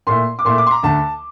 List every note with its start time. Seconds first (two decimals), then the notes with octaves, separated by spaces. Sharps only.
0.07 A#2 A3 E4 C6
0.39 D6
0.45 A#2 A3 E4 C6
0.58 D6
0.66 C6
0.71 A#5
0.83 D2 D3 A3 A5